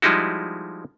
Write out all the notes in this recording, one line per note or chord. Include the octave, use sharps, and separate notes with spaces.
F3 G3 G#3 D#4 E4 F#4